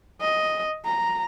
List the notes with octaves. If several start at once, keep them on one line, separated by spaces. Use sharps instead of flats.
D#5
A#5